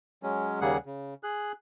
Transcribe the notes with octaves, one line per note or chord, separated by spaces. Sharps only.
F#3 G#3 C#4
D#2 C#3 G3 A#3 G#4 F#5
C#3
G#4 F#6